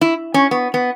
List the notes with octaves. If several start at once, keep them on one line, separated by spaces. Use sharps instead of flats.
E4
C#4
B3
B3